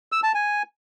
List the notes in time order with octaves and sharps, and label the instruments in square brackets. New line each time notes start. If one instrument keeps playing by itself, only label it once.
[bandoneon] E6
A5
G#5